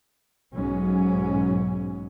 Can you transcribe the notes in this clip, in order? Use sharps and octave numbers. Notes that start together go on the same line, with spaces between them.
B1 G#2 F#3 C#4